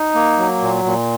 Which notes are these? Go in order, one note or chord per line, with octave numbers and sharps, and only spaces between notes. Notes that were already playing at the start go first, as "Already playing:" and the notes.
Already playing: D#4
A#3
F#3
A#2
A#2